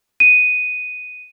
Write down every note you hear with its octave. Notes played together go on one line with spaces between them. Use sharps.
D#7